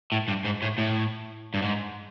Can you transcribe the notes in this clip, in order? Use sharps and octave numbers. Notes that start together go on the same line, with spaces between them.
A2
G2
G#2
A2
A2
G2
G#2